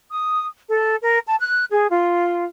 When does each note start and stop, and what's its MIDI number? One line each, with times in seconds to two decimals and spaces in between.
0.11 0.46 87
0.69 0.95 69
1.02 1.18 70
1.26 1.35 81
1.40 1.64 90
1.71 1.87 68
1.90 2.44 65